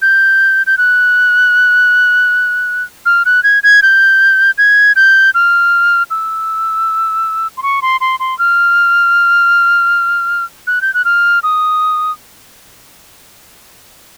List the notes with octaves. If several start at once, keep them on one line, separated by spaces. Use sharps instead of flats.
G6
G6
F#6
F6
F#6
G#6
G#6
G6
G#6
G6
F6
E6
C6
C#6
C6
C6
C6
F6
F#6
G6
F#6
F6
D#6